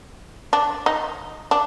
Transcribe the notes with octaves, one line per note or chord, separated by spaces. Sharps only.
D4
D#4
D4